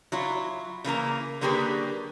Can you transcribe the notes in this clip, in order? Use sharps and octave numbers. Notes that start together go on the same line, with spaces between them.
F#3 E4 F4
C#3 E3 A#3 A#5
D3 F#3 A#3 G4 G#4 B4